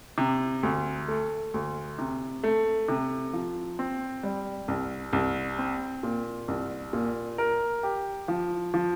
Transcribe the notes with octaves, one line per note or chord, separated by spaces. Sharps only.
C3
D2
A3
D2
C3
A3
C3
F3
C4
G3
C2
C2
C4
A#2
C2
A#2
A#4
G4
F3
F3